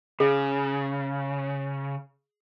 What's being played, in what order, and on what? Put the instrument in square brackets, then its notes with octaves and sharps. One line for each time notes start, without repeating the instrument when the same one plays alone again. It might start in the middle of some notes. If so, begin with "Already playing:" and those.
[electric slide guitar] C#3 [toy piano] G#4